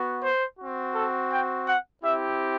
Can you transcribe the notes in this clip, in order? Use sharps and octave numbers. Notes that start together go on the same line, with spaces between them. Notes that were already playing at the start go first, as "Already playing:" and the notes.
Already playing: B3 F#4
C5
C4 F#4
A4
G5
F#5
C4 E4 G4 E5